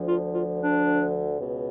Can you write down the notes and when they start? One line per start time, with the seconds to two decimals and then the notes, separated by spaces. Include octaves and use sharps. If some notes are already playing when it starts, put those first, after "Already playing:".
Already playing: D2 D3 F3
0.08 F4
0.34 F4
0.61 D4
1.39 C#2 B2